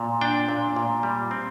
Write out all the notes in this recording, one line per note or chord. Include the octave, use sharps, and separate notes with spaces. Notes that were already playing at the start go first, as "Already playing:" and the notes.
Already playing: A#2
D4 G5
A#2
A#2
G3
C4